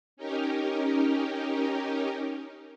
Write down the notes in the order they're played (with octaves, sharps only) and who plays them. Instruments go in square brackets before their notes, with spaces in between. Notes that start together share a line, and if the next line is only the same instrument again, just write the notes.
[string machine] C#4 D#4 G4 A#4